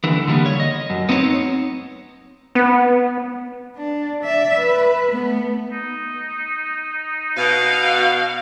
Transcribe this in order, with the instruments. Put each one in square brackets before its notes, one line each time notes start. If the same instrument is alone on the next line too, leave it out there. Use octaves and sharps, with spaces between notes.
[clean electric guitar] D#2 D3 E3
D3 E3 G3 A#3 B3
C#5
D#5
F#2
B3 C4 D#4 E4 C#5
[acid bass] B3
[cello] D4
D5 E5
B4
A3 B3
[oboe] D#4
[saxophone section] B2 [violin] F5